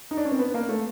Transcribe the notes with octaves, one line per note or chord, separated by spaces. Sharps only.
D#4
D4
C#4
C4
B3
A#3
A3